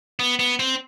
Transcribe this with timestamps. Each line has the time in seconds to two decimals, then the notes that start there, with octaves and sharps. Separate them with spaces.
0.20 B3
0.39 B3
0.59 C4